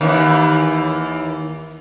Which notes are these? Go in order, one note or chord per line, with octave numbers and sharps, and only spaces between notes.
D#2 E3